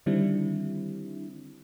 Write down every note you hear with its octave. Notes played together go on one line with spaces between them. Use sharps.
D3 D#3 G3 C4 D4 E4